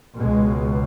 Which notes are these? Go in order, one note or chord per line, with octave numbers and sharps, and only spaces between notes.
C#2 B2 G#3